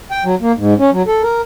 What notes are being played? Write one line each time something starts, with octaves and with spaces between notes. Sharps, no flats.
G5
F#3
A#3
G#2
C#4
F#3
A4
A#4